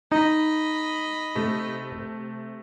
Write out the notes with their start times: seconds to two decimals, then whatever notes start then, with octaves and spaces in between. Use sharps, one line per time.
0.12 D#4 D#5 B5
1.35 C3 A3